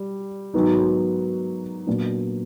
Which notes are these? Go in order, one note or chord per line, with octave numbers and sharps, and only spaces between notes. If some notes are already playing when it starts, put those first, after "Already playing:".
Already playing: G3
G#2 D#3 F#3 B3 D#4
A#2 F#3 B3 D4